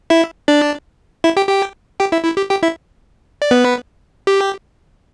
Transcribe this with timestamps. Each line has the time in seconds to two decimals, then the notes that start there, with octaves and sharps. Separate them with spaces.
0.10 E4 E5
0.48 D4 D5
1.24 E4 E5
1.37 G4 G5
1.48 G4 G5
2.00 G4 G5
2.12 E4 E5
2.25 E4
2.37 G4
2.50 G4 G5
2.63 E4 E5
3.42 D5
3.51 B3 B4
4.27 G4